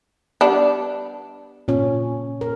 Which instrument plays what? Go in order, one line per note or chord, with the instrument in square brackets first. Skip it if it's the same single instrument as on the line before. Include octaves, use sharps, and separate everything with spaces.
[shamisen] G3 B3 D4
[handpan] A#2 C#4
A#4